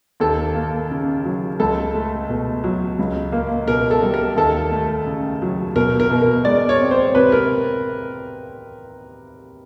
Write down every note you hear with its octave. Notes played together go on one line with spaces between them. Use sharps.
D#2 A4
A#3
C#3
F#3
C#2 A4
A3
B2
F#3
C#2
A#3
B2 A#4
A4
G3
A#4
D#2 A4
A3
C#3
F#3
B2 A#4
A#4
B2
A#4
G#3 D5
C#5
C4
C5
C3 B4
A#4